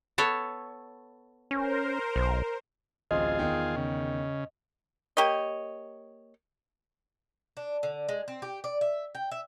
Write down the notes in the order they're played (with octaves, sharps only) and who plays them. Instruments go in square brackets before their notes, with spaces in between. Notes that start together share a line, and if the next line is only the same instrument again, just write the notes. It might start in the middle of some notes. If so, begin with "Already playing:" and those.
[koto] B3 A4 C#5
[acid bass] C#4 [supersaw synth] A#4 C5
[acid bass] B1
[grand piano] D1 A1 C4 [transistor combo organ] F4 G#4 [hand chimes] D#5
[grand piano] E2 D#3 G5
[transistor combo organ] C#3
[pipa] A#3 G4 C#5 D#5
[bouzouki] D4
D3
G#3
C4
G4
D5
E5
G5
E5